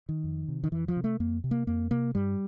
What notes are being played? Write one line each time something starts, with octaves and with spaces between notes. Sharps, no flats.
D#3
F2
C3
D#3
F2 E3
F3
C3
A3
F2 A#3
C3
A#3
F2 A#3
C3 A#3
G2 G3